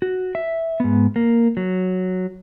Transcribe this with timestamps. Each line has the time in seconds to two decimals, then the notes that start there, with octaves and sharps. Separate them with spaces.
0.02 F#4
0.35 E5
0.80 G#2 B3
1.16 A#3
1.57 F#3